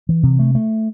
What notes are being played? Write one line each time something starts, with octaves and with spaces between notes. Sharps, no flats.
E3
C3
A3
A3